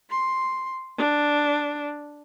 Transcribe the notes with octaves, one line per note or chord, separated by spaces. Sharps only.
C6
D4